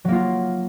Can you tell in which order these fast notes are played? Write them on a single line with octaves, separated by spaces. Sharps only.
F#3 A#3 F4